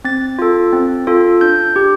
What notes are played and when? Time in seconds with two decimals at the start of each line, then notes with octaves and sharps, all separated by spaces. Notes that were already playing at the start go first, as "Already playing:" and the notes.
0.04 C4 A6
0.39 F4 A4
0.73 C4
1.07 F4 A4
1.41 D4 G6
1.76 G4